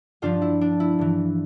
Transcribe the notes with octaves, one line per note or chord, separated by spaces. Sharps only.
G2 F3 D4 F4
E4
D4
E4
G2 E3